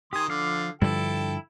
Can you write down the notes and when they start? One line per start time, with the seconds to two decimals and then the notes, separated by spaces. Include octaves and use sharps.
0.13 D#3 G4 G#5 C6 D#6
0.28 D3 F3 F5
0.82 G2 D3 F3 E4 A4 G5